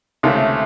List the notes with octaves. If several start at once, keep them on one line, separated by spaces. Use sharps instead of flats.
C#2 C3 D#3 A3